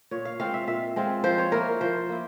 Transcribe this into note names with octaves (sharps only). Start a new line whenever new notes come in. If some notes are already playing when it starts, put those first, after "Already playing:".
A#2 C#5
F5
G#3 C4 F4 F5
E5
A#2 E5
G#3 C4 F4
F3 C5
C#5
A#3 E4 A#4
F3 C5
A#3 E4